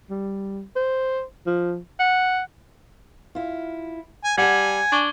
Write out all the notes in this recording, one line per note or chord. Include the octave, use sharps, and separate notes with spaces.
G3
C5
F3
F#5
E4 F4
G#5
G3 F#5 G#5 A5 G#6 C#7
D4 C#6 G7